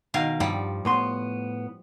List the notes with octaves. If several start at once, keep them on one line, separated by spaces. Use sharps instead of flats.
B2 D#3 F5
G2 F3 G3
A2 B3 C6